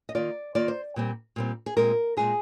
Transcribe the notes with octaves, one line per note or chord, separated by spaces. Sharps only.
D#5
D#3 A#3 F4 D5
D#3 A#3 F4 D5
C5
A#2 G3 C4
A#2 G3 C4
G#4
A#2 G#3 C4 A#4
A#2 G#3 C4 G#4